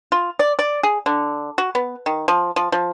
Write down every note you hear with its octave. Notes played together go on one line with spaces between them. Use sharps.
F4
D5
D5
G#4
D3
F#4
B3
D#3
F3
F3
F3